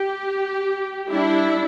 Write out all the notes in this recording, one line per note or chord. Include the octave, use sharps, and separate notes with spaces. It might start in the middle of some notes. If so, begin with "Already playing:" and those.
Already playing: G4
G3 D4 E4